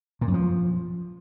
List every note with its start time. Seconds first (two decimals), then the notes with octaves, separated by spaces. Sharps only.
0.21 A#2
0.28 F#2
0.34 F3